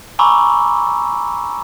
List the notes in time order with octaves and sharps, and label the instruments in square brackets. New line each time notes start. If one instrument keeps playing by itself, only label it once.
[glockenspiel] G#5 A#5 B5 C#6 D6 E6